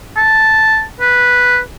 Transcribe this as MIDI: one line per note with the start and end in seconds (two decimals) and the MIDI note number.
0.17 0.84 81
1.00 1.60 71